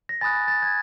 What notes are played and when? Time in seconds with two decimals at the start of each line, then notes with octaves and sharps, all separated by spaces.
0.09 A#6
0.21 G#5 B5 D#6 F#6 A6
0.48 A6
0.62 G#6